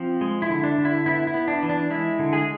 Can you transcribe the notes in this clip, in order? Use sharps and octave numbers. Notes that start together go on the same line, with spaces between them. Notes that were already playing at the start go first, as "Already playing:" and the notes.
Already playing: F3 C4
G#3
E4
D3
D4
D3
E4
B3 E4
E4
B3
D4
E3
D4
G#3 E4
D3
G#3 G#4